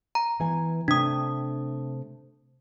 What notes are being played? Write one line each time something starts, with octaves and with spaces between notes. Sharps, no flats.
A#5
E3 B3 G#5
C3 A3 D4 D#6